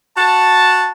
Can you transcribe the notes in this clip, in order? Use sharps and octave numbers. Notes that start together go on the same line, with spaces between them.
F#4 F#5 A5